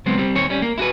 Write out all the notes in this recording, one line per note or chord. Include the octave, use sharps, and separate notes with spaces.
C#2 F#3 G#3 B3 C4
G3 C4
D#2 C4 C#5
G3 C#4
A#3
E4 F#4 G#4 B4